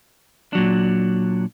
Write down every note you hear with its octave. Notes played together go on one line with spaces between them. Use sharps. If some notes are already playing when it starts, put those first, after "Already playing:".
A#2 F#3 D4